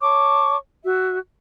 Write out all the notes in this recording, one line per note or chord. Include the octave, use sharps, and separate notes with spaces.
C#5 A5 C#6 D6
F#4 E5